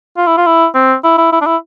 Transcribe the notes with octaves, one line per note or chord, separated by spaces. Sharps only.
F4
E4
F4
E4
C4
E4
E4
E4
D4
E4